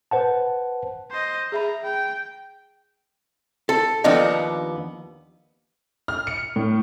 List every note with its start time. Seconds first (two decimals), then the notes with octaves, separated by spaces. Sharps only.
0.11 B4 C5 F#5 A5
1.11 C5 D#5
1.52 G#4 E5 A#5 B5
1.83 G5
3.69 A4
4.04 D#2 F3 B3 D4 D#4
6.08 F6
6.27 C#7
6.56 A2